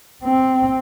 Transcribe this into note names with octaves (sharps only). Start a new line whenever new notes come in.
C4